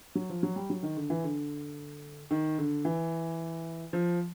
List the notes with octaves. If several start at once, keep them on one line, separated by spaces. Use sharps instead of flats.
F#3
F3
F#3
G3
F#3
D#3
D3
E3
D3
D#3
D3
E3
F3